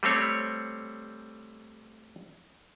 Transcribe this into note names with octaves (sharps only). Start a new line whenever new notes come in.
G3 A3 C4 C#5